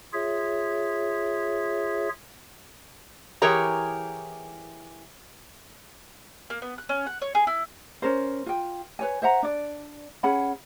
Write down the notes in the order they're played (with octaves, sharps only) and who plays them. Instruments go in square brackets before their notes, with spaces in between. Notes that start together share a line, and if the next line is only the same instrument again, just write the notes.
[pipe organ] F4 G#4 C#5 E5
[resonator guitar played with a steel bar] E3 G4 G#4 A#4 C#5 A#5
[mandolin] A#3
B3
F#6
C#4
F#5
C#5
G#4
E4
[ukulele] C#4 A#4 C5
F4 G5
B4 C#5 G#5
C5 E5 F#5 A#5
D4 D5
C#4 G#4 F#5 B5